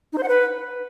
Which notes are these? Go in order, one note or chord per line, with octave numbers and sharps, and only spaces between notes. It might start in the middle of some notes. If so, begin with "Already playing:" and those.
D#4
C5
F#5
B4